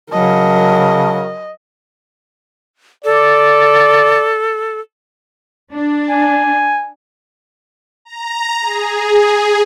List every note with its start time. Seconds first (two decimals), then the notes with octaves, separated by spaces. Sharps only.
0.13 C#3 F#3 A#4 D#5 A5
3.05 A4 D5
5.73 D4
6.09 G#5
8.05 A#5
8.61 G#4